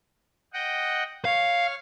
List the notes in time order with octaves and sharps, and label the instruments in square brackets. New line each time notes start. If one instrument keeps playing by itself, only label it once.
[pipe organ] D#5 F#5 G5
[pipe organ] C#5 F6 [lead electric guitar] F5